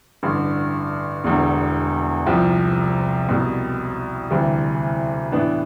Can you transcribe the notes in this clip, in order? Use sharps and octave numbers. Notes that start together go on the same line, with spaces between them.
A1 G2 D3
E1 E2 D3
C2 C3 F3
C2 B2 G3
D2 C3 E3 G3
A2 E3 B3 D4